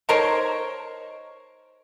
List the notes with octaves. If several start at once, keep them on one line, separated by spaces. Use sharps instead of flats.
D#4 A#4 C5 C#5